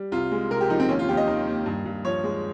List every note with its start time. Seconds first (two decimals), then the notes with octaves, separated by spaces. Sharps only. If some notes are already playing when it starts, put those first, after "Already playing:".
Already playing: G3
0.12 C2 F4
0.32 G#3
0.51 C3 A#4
0.61 G4
0.70 F3 D#4
0.80 C4
0.89 D#2 C#4
0.99 F4
1.08 D#2 G4
1.17 D#5
1.28 D#3
1.47 A#3
1.66 G2
1.86 G2
2.05 F3 C#5
2.24 G#3